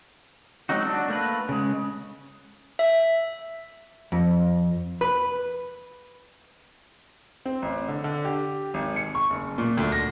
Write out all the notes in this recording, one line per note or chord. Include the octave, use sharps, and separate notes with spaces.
F#3 G#3 C4 D#4 F#4
D4 F#4
A3 A#3 B4
C#3 G#3
E5
F2
B4
C4
A1
D3
D3
G4
G#1
C#7
C#6
F#1
A#2
D2
A#6